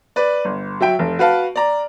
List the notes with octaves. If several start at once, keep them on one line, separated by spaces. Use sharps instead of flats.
B4 D5
G1
F#3 E5 G5 D7
F1
F#4 B4 F5 A5
D5 A#5